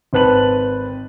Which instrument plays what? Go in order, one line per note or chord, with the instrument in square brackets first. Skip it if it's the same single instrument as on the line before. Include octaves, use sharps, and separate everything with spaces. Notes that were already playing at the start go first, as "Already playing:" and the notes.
[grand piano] G#1 C4 B4 A5 F#7